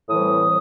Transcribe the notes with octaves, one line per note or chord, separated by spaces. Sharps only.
A2 E3 G3 C4 D#6